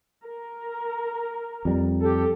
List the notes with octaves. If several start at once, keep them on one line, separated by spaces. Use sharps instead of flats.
A#4
F2 G3
G4 A4